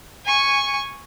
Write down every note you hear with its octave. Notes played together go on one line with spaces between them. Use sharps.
G#5 C#6